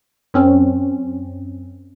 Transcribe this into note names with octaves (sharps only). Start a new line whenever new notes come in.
F#2 C4 C#4